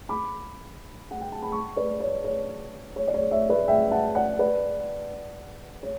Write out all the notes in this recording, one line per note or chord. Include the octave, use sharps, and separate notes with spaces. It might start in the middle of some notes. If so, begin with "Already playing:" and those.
B5 D6
F#5
G5
A5
B5
A5 C#6
B4 D5
C#5
C#5
C#5
D5
C#5
C#5 E5
B4 D5
E5 G5
F#5 A5
D5 F#5
B4 D5
C#5